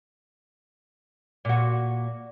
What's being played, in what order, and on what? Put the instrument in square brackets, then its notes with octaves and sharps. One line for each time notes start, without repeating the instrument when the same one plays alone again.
[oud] A#2 F#4